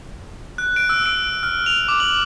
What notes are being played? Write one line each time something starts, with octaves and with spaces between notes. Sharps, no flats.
F#6
D7
E6
D7
F6
F7
D6
F#7